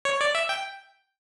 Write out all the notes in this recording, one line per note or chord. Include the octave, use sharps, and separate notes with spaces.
C#5
D5
E5
G5